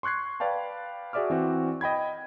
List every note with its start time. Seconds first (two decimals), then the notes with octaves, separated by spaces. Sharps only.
0.03 C6 C#6 F#6 G#6 C7
0.40 B4 D5 F5 G5 A5
1.13 F#4 G#4 D5 E5 D6 F6
1.30 E3 C4 F#4
1.81 D#5 G5 B5 G#6